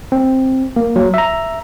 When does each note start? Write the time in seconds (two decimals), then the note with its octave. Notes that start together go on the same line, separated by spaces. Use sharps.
0.12 C4
0.76 A#3
0.96 F#3
1.14 E5 A#5